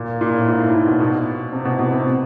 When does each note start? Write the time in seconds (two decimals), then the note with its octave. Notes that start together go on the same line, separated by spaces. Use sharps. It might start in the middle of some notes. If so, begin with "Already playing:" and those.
Already playing: A#2
0.21 A#2
0.33 A2
0.47 G#2
0.60 A2
0.74 A#2
0.86 B2
1.00 B2
1.52 C3
1.65 B2
1.79 B2
1.92 C3